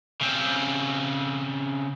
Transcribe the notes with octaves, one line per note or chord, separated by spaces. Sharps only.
C#3 C4